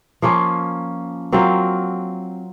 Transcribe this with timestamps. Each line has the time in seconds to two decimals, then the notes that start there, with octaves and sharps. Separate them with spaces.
0.22 F3 A#3 C#4 F4
1.32 F#3 C4 F4 A#4